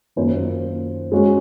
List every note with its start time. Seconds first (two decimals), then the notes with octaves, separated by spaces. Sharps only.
0.16 F#2 D#3 A#3 F4 C5
1.12 G#3 C#4 F#4